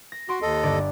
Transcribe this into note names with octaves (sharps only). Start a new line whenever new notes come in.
A#6
F#4 C6 D7
D#2 A4 D#5
G1 D5